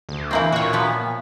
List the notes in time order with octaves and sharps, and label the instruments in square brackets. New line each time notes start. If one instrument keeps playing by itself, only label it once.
[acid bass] D2
[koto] E3 A#3 C4
[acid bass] A#2 [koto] F#4 C#5
[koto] F3 B3